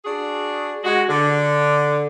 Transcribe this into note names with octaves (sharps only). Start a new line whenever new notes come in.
D4 F#4 G#4
G#3 F#4
D3